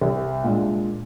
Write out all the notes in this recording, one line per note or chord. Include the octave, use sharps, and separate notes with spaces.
C2
A#2 G#3 D4